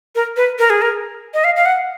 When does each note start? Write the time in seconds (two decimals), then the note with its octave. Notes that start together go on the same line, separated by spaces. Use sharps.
0.15 A#4
0.37 B4
0.59 A#4
0.70 G#4
0.82 A#4
1.34 D#5
1.44 F5
1.56 F5
1.66 F#5